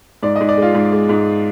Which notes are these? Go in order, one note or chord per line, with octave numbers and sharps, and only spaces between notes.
G#2 D5
D#5
G#2
D5
G#3 F4
G#2
G#3
G#2